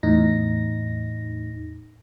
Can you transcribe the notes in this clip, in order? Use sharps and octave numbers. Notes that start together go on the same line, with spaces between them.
E2 A2 D#4 A#6